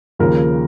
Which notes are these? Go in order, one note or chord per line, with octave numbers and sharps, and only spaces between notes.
D#2 C#3 F3 A#4